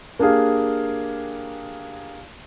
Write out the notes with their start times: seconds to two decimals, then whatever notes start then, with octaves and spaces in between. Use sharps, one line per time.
0.19 A#3 D4 G4 G#4 F5